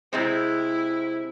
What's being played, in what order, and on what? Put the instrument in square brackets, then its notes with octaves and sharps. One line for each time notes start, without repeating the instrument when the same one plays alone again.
[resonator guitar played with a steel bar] C3 G#3 C4 [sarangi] E4